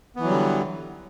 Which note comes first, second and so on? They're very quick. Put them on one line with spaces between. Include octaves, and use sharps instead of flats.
B3 E3 F#3 G3 D3